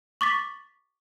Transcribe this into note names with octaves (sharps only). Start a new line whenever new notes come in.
C#6 D6 A6 B6